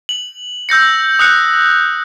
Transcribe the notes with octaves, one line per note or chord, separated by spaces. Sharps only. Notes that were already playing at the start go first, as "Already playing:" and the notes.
F#7
E6 G6 A#6 C#7
D#6 F#6 C#7